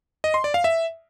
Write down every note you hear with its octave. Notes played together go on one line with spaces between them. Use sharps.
D#5
C6
D5
F5
E5